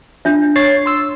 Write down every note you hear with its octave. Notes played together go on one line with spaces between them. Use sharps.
D4 F4 E5
C#5 A6 C7
C6 E6